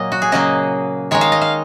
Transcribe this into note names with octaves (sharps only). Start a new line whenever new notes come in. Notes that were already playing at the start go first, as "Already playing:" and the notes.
Already playing: A#2 F#3 A#3 D#5
F#4
G#4
C#3 F#3 A#3 D#5
D#3 G#3 D#4 C#5
F5
D#5
F5